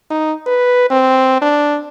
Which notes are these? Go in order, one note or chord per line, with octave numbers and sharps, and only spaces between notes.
D#4
B4
C4
D4